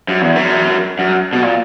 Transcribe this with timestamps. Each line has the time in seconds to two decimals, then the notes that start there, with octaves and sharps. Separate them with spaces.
0.08 F#2
0.22 E2
0.35 F#2
0.99 F#2
1.33 B2
1.42 A#2